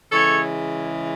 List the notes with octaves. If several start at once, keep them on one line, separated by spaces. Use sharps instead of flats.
C#3 E3 G#3 A4 C#5